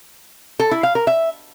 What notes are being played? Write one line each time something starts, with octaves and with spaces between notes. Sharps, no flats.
A4
E4
F5
A#4
E5